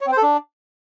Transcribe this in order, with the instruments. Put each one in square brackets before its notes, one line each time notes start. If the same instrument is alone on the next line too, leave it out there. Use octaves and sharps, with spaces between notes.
[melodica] C#5
C4
C5
A4
D4